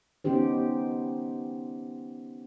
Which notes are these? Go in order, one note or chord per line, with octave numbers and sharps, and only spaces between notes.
B3 C#4 D#4 G4 C5